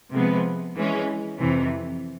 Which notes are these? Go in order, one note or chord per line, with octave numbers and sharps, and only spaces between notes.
C3 F3 G#3 B3
E3 G#3 C#4
F2 C3 E3